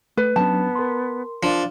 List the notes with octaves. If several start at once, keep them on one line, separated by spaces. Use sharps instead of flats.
A3 B4
F#3 B3 C#4 D4 A5
A#4 C6
F3 D4